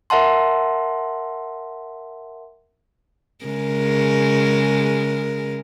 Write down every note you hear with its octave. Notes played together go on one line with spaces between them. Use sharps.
A#4 E5 F#5 A5 C6
C#3 G#3 A#4